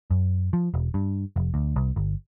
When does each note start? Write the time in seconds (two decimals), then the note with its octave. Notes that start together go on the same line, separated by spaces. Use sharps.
0.11 F#2
0.53 F3
0.74 E1
0.94 G2
1.36 F1
1.54 D2
1.76 C2
1.96 G1